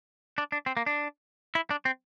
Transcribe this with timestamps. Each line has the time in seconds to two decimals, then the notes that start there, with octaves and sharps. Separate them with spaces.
0.38 D4
0.52 D4
0.66 C4
0.77 A#3
0.86 D4
1.55 E4
1.71 D4
1.85 C4